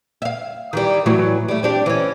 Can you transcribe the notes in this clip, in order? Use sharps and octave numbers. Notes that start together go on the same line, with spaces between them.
E5 F5
D#3 E3 G3
A2 E3 F#3
G3 A3
C4 D4 G4
E3 C#4